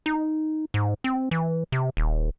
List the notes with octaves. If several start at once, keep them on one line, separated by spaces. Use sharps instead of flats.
D#4
G#2
C4
E3
C3
D#1